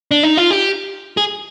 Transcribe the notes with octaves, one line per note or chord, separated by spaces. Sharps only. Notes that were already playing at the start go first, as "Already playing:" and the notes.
D4
D#4
F4
G4
G#4